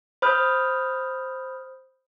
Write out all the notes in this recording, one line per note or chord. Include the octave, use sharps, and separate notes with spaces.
C5 B5 D#6 F6 G6